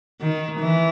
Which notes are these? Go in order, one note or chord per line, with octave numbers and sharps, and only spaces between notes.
D#3
E3